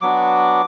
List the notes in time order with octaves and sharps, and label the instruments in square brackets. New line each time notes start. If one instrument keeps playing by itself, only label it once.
[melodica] F#3 B3 D4 F#4 D6